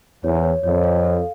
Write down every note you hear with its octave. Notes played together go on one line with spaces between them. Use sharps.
E2 C#5
C#5
F2 C#5
F5
A4